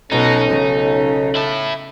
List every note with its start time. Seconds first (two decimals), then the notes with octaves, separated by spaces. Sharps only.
0.12 B1 B2 C#4 D#4 A4
0.51 C#3
1.35 E4 A5